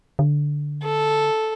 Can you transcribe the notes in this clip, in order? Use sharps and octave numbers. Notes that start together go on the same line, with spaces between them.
D3
A4